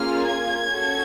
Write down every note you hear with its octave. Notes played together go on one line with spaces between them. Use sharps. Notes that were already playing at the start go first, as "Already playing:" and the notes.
Already playing: A#3 C#4 F4 G#4 F6
G#6
C#4 F#4 A4